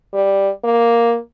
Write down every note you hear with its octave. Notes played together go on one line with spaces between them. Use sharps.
G3
A#3